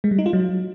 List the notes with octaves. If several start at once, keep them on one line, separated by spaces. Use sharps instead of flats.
G#3
G3
D#4
F4
F#3